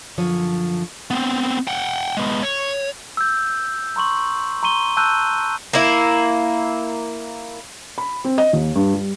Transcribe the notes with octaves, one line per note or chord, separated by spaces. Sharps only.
F#2 D3 F3 C#5
B3 C4
F#5 G5
G#3 B3
C#5
E6 G6
A#5 C6 C#6 F#7
A#5 C6 C#6 D#7 G7
A5 E6 F#6 G6 D#7
A#3 E4
B5
C4
D#5
D#2
G2
G3